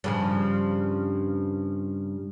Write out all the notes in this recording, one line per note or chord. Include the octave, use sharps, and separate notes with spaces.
G2 C#3 F3